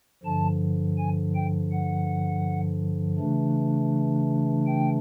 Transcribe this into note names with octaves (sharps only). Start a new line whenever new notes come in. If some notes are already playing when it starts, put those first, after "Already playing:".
G2 D3 F3 A5
G#5
G5
F#5
C#3 E3 A3 D4
G5